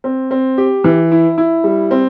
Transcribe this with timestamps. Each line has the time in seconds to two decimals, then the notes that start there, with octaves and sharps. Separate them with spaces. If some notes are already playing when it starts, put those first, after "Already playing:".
0.04 C4
0.31 C4
0.58 G4
0.84 E3
1.11 E4
1.38 E4
1.64 G3
1.91 C4